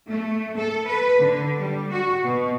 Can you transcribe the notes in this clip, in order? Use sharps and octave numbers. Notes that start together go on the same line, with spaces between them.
A3
A4
B4
D3
G3
F#4
B2